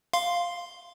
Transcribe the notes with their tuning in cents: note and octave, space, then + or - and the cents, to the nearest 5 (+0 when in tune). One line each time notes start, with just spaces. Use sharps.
F5 +0 C6 +0